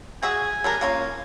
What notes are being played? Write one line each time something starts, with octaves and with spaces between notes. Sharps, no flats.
F#4 G#4 E5 G#5
G3 D4 A#4
A#3 C#4 F4